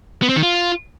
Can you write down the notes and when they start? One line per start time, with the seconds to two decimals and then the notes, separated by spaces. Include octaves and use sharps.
0.22 B3
0.29 C4
0.36 D#3
0.43 F4